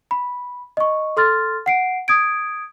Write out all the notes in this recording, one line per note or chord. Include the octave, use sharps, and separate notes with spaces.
B5
D#5 C#6
A4 C6 F6 A6
F#5 C7 D7
D#6 G#6 D7